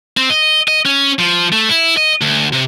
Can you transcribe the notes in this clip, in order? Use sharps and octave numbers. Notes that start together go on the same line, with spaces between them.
C4
D#5
D#5
C#4
F3
A3
E4
D#5
D2
C3